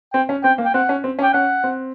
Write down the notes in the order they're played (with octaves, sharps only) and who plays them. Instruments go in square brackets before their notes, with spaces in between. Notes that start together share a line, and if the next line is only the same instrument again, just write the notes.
[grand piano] C4 [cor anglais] G5
[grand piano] C#4
[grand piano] C4 [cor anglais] G5
[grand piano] A#3
[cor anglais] G5
[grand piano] C4 [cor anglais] F#5
[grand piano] C#4
C4
C#4
[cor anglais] G5
[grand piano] C#4 [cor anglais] F#5
[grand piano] C4